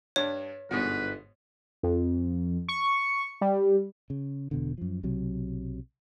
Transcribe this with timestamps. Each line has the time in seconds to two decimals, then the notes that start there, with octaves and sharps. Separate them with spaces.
0.16 G2 D4 C#5
0.71 G1 G#2 B2 F#4 B4
1.83 F2
2.68 C#6
3.41 G3
4.10 C#3
4.51 E1 B2 D3
4.78 F#2 F3
5.03 B1 C3 F#3